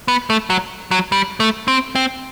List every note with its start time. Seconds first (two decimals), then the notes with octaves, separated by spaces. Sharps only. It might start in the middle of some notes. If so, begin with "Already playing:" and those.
0.08 B3
0.30 A3
0.50 F#3
0.91 F#3
1.12 G3
1.40 A3
1.68 C4
1.95 C4